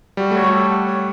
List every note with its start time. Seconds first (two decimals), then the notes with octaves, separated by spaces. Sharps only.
0.17 G3 F#4
0.31 A3 C#5
0.44 G3
0.52 A4
0.70 F#5
0.87 C#5